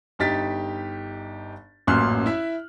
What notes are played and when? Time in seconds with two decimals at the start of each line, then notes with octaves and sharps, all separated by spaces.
0.19 G1 D#4 G4 A6 B6
1.87 A1 F#2 A#2 C6 F6 F#6
2.26 E4 E5